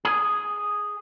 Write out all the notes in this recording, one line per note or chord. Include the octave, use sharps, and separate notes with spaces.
G#4